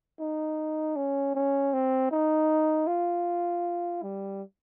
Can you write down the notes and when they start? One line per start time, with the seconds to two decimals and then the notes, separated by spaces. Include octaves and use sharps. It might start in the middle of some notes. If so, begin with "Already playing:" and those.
0.20 D#4
0.96 C#4
1.35 C#4
1.73 C4
2.11 D#4
2.87 F4
4.02 G3